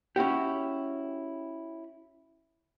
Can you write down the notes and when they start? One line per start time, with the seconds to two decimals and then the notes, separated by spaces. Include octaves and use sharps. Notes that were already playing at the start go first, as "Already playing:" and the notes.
0.16 C#4 E4 F#4 G4